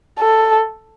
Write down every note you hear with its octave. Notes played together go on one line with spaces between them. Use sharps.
A4